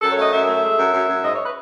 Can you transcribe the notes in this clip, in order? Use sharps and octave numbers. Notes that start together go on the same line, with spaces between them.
F#2 A4
C#5
A3 D#5
F#2 E5
A3
G#3
F#2
F#2
F#2
G#2 D#5
C#5
B4